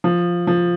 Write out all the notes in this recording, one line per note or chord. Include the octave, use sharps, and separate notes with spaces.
F3
F3